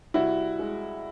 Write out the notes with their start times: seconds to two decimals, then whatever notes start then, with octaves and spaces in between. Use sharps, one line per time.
0.14 C2 E4 F#4
0.59 G#3